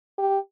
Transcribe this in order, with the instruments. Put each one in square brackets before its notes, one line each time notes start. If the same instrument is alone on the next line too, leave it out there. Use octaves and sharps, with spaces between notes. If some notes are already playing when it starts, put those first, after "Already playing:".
[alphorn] G4